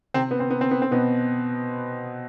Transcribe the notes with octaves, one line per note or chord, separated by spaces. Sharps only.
C3 C4
B3
C4
B3
C4
B3
C4
B2 B3